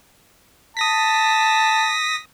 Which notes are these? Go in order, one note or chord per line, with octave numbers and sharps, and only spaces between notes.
A5 D#6 A#6 B6